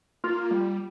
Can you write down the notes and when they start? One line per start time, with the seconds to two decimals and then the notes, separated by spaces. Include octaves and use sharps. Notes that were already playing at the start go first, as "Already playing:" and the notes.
0.24 A#3 F4
0.51 G3